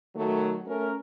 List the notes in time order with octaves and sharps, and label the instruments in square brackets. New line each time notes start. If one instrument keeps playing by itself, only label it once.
[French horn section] D#3 F#3 A3
A3 C#4 A#4